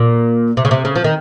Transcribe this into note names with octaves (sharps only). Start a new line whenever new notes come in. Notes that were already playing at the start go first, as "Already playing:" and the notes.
Already playing: A#2
C3
C#3
C3
C#3
F3
D#3